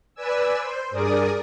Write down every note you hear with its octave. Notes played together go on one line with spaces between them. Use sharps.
B4 D5 G#5 E6
C5
G2 G#4 A#4 D5 D#6